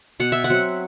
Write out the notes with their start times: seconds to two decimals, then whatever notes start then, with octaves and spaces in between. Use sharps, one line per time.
0.20 B2 F#5
0.32 E5
0.44 F#5
0.50 F#3 C4